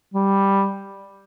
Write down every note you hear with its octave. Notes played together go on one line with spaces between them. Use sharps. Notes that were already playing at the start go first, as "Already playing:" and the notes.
G3